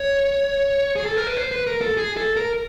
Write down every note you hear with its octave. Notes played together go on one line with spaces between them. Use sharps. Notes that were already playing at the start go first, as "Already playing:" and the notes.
Already playing: C#5
G#4
A4
A#4
B4
C5
B4
A#4
A4
G#4
A4
A#4